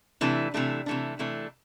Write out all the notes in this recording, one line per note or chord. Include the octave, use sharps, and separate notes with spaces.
C3 E3 A3 D4
C3 E3 A3 D4
C3 E3 A3 D4
C3 E3 A3 D4